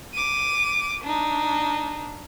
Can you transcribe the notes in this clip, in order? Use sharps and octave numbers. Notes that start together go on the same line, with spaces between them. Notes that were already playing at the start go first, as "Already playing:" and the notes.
D6 D#7
D4 D#4